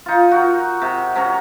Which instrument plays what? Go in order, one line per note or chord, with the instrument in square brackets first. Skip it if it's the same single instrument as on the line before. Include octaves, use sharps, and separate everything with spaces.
[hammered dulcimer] D#4 F4
F#4 A#4
C3
C3 C#4 A#5